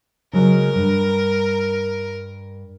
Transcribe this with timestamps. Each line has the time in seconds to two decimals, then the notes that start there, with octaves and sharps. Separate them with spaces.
0.33 C#3 F#3 G#3 A#4
0.75 G2